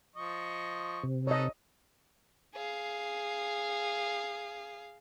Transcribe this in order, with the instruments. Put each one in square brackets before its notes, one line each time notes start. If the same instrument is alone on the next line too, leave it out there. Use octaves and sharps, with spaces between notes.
[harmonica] F3 D#5 C#6
[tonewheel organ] C3
[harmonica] D#4 A4 B4 [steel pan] C#5 D#5
[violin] G#4 F5